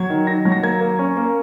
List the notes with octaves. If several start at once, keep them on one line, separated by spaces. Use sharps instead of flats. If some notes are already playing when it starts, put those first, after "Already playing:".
Already playing: F#3 G#6
D#3
D#3 A#6
F#3
A#6
A#3 G#6
A#3
C#4
A#3